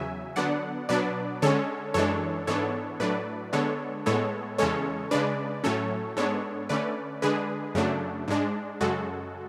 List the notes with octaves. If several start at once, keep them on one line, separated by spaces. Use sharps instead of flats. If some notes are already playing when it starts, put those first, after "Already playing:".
Already playing: E2 C#3 F#3 E5 G#5
D3 F#3 B3 D4 D5 F#5
B2 F#3 B3 D4 B4 D5
D3 G#3 C#4 A4 C#5
F#2 E3 G#3 D4 A4 C#5
G#2 E3 B3 D4 A4 C#5
A2 F#3 A3 D4 B4 D5
D3 G#3 B3 D4 A4 C#5
A2 G#3 B3 A4 C#5
E2 C#3 G#3 C#4 A4 C#5
C#3 G#3 D4 B4 D5
A2 F#3 A3 C#4 A4 C#5
G#2 G#3 B3 D4 A4 C#5
D3 A3 C#4 B4 D5
D3 G#3 D4 G#4 B4
F#2 C#3 F#3 A3 D4
G#2 G#3 D4
F#2 C#3 G#3 F#4 A4